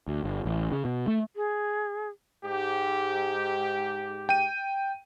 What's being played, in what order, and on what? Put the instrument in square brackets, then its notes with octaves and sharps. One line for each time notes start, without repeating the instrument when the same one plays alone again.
[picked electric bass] D2
G1
A1
C#3
B2
A3
[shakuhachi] G#4
[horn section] G#2 G4
[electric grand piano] G5 D#7